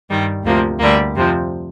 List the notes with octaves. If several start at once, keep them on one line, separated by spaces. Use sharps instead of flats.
G2 D#3 G3
D2 C3 F3 A#3
D2 D3 G3 A#3
F2 C3 F3